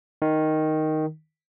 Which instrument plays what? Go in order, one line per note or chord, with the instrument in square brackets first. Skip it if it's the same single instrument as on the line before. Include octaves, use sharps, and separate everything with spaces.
[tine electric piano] D#3